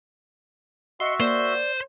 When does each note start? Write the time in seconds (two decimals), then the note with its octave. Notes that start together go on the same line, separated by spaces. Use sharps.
1.00 F#4 D#5 E5 C6 C#7
1.20 A#3 C5 D5